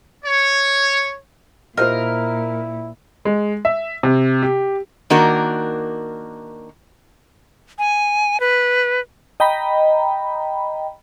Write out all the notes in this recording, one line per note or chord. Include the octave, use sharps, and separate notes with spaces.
C#5
A#2 E4 F4 A#4 C5 D#5
G#3
E5
C3
G4
D#3 A#3 D4 F#4 A#4
G#5
B4
D#5 G5 A#5 B5